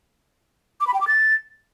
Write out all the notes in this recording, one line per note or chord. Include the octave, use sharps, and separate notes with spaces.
D6
B5
G5
D6
A6